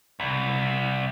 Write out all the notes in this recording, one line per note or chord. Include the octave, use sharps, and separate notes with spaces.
C2